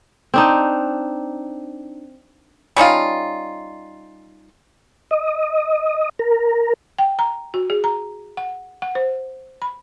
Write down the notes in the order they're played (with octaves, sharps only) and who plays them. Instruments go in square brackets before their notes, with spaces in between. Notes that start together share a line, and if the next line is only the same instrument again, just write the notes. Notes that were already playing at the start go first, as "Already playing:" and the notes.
[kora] C4 D4 D#4
[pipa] G3 C#4 D#4 F4
[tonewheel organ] D#5
A#4
[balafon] G5
A#5
F#4
G#4
A#5
F#5
F#5
C5
B5